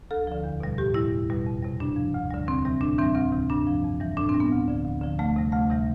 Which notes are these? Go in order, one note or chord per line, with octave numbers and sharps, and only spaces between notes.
D2 A4
D3 F3
E2
B2 G3
A2 G4
G3 E4
E2
B2 G3
F2
C3 G3
G2 D4
F3
D2
D3 G3
E2 C4
C3 E3 G3
A2 D4
E3 G3 C4
D2 C4
C3 E3
G2 D4
F3
F2
E3 G3
A2 D4
C4
G3
B3
D2
D3 F3
D2
D3 F3
D2 A3
C3 G3
D2 A3
C3 E3 G3